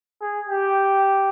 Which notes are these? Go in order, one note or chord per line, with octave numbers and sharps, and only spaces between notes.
G#4
G4